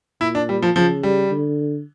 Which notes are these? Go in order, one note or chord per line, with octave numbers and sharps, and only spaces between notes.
A#2 E4
D4
G3
F3
C#3 F3
G3
D3